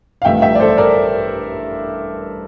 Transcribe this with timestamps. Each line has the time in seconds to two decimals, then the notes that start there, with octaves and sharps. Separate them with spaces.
0.22 F5
0.25 A1 G2 F3 A3 E5 G5
0.42 E5 G5
0.55 D5
0.60 A4 C5
0.78 A#4 D5